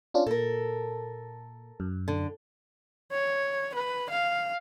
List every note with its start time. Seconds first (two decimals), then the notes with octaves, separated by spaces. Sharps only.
0.14 C#4 D4 F4
0.27 A#2 A4 A#4
1.80 F#2
2.08 D3
3.12 C#5
3.75 B4
4.10 F5